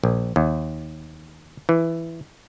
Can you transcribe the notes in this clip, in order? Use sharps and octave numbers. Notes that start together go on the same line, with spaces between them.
A#1
D#2
E3